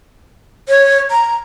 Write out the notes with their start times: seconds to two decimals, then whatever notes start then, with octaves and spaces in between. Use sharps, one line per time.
0.69 C#5
1.11 A#5